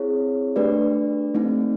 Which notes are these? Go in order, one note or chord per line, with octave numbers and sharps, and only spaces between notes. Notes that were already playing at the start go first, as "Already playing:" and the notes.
Already playing: C4 E4 G#4 C#5
A3 D4 G4 B4 D5
A3 C4 D#4